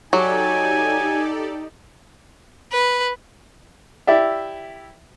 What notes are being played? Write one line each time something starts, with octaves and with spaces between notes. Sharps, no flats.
F#3 D#4 G4 A4 D5 G#5
B4
E4 G4 D5 E5